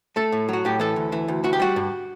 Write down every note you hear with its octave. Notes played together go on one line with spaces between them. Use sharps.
A3 A4
A2
F#3 F#4
A2 G4
E3 A4
D2
E3
D2
E3 F#4
G4
G3 F#4
G2